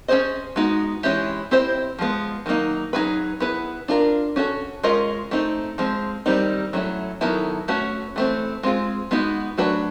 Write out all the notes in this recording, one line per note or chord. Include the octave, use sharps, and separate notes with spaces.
C#4 F4 G#4 C5 D#5
G#3 B3 D#4 F#4
E3 G#3 C#4 E4 G4
C4 E4 G4 C5 D#5
F3 G#3 B3
D#3 F#3 A#3 D#4
F#3 A#3 D#4 G#4 B4
B3 E4 G#4 B4
D4 F4 A#4
C#4 F#4 A4
G#3 C#4 F4 A#4 D#5
A3 C4 D#4
F3 G#3 C4
D#3 G3 C4 D#4
F#3 A3 C#4 E4
D#3 F#3 B3 E4 A4
A3 C#4 F#4 B4
E3 A3 C4
G#3 C4 F4 G#4
G#3 B3 D#4 F#4
F#3 A3 D4 F#4 B4